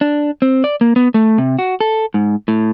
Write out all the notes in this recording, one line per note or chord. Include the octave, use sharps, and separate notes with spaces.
D4
C4
D5
A#3
B3
A3
C3
F#4
A4
G#2
A2